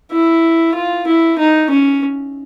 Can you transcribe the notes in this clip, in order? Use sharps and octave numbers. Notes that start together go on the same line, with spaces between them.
E4
F4
E4
D#4
C#4